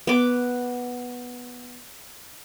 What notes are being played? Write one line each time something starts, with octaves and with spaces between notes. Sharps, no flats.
B3 D6